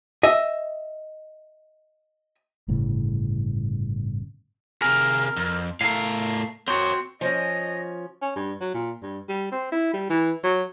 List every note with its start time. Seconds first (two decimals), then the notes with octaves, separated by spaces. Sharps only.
0.23 D#5 E5
2.68 G1 A2 C#3
4.82 C3 G#4 A#4
5.36 F2
5.81 A2 A3 A#4 F5
6.68 C4 F#4 A#4 C#5
7.21 F3 C#4 D#5
8.22 C#4
8.36 G2
8.61 F#3
8.75 A#2
9.03 G2
9.29 G3
9.52 C4
9.72 E4
9.94 G3
10.10 E3
10.44 F#3